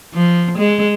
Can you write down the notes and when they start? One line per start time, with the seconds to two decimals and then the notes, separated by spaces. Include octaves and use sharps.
0.14 F3
0.59 G#3